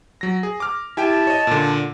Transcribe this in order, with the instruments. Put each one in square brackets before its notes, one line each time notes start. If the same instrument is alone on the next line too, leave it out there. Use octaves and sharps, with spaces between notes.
[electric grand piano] F#3 A#6
G#4
D6 F6
[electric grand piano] E4 G4 G5 [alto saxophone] A5
[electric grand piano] C#5 D#5
A#2 D3